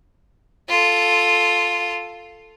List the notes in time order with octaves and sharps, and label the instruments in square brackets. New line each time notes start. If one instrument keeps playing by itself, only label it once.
[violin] F4 A4